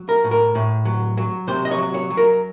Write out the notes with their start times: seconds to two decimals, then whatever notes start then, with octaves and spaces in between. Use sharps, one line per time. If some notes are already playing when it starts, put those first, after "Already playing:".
Already playing: F#3
0.09 A#4
0.24 A2
0.31 A#4
0.55 A2
0.85 F#3
1.17 F#3
1.47 C3 C5
1.65 D#5
1.71 C#5
1.78 F#3
1.94 C#5
2.10 F#3
2.17 A#4